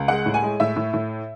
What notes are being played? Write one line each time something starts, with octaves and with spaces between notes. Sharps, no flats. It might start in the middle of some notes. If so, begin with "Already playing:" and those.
Already playing: C#2
G#3 F#5
A2
G#5
G#3
A2 E5
A2
A2